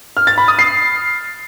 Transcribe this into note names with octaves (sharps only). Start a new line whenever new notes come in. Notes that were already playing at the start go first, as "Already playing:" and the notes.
F6
A6
B5
D#6
C7